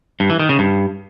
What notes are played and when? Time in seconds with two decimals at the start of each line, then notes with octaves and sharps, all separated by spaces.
0.20 G2
0.30 E3
0.40 D#3
0.49 C#3
0.59 G2